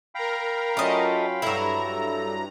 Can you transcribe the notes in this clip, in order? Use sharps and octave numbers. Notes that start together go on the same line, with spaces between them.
A#4 F5 G5 A#5 B5
F#3 A3 C#4 F4 D#5
G2 F#3 E4 A4 A#5